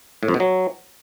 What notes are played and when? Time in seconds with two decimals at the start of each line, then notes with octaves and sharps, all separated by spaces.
0.23 A2
0.28 F2
0.34 B2
0.40 F#3